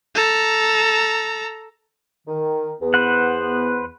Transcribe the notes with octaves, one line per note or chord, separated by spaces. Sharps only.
A4 A#5
D#3
E2 B3
B4 C5 F#5